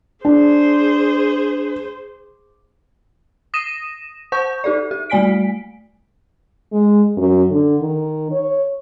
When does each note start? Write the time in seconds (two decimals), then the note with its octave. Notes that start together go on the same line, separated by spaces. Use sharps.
0.25 D4 G#4 C5
3.54 D#6 A#6 D#7 E7
4.32 C5 F#5 C#6 G6
4.64 D#4 G4 A4 D5
4.91 G4
5.10 G3 A3 D5 G#5 B6 D7
6.72 G#3
7.17 F#2
7.51 D3
7.81 D#3
8.32 C#5